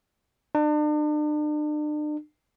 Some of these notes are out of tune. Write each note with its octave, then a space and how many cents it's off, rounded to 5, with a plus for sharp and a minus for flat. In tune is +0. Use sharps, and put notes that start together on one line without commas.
D4 +40